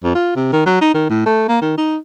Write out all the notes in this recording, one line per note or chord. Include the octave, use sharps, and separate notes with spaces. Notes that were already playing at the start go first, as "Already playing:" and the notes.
F2
F4
C3
D#3
F#3
D#4
D#3
A2
A3
A#3
D#3
D#4